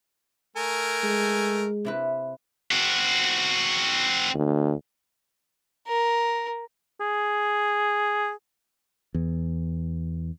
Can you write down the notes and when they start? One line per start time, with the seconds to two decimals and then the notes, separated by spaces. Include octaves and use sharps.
0.56 A3 A#4 G#5
1.03 G#3
1.85 C3 E4 B4
2.71 C4 F#4
4.35 D2
5.88 A#4
7.00 G#4
9.14 E2